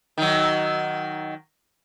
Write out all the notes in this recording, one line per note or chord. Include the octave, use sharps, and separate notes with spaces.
D#3 F#3